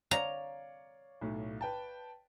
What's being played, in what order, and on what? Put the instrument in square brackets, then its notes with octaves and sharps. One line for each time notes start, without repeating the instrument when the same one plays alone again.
[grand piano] C#5 D5 F5 [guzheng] A#5
[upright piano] B1 A2
B4 G5 A5